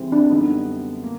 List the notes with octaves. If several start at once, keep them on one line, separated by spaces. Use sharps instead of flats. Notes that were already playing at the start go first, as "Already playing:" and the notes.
Already playing: C2 C3 E3 G#3 C4
D4
F#2 D3 G3 B3 D#4
A#3